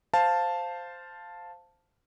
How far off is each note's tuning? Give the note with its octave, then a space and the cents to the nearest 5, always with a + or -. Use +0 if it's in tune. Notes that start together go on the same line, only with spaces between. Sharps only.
C5 -5 F5 +0 A5 +0